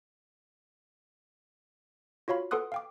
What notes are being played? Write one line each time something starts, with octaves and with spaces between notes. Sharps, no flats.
F4 F#4 C#5 F5 B5
A4 B4 F#5 C6 D#6 F#6
F5 G5 D6